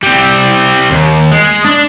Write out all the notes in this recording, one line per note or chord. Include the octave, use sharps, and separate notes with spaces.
G3 C4
D#2
G#3
D4